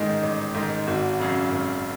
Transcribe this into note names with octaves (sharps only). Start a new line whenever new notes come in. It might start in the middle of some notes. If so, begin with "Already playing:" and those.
Already playing: A1 G#2 D#3 G#3 G#4
A1
G#2 D#3 G#3
G#1 F#4
F#2 C#3
G#1